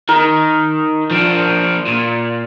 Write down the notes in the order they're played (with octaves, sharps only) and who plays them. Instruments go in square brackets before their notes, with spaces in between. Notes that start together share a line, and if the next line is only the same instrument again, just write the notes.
[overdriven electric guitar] D#3 [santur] A#4
[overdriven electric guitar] F3 D4
A#2